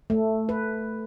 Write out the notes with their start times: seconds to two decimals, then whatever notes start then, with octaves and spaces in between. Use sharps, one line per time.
0.10 A3
0.49 B4